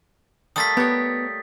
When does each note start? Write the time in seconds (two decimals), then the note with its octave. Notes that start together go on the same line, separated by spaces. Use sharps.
0.56 G3 A3 A#3 D#6 A6 B6
0.77 B3 G4 C#5